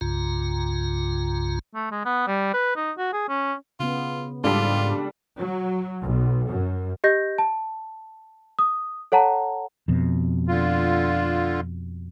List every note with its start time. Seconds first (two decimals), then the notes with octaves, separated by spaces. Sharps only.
0.01 C2 G2 C#3 F4 A#5
1.75 A3
1.91 G#3
2.05 B3
2.27 G3
2.54 B4
2.76 D#4
2.98 F#4
3.13 G#4
3.29 C#4
3.80 C#3 B3 F4
4.44 G#2 G3 G#3 D4 F4 A4
5.37 F#3
6.01 B1
6.49 F#2
7.04 G4 D#5 G6 A#6
7.38 A5
8.59 D#6
9.12 A4 C#5 F#5 A5 A#5
9.88 F2 B2
10.48 D3 F4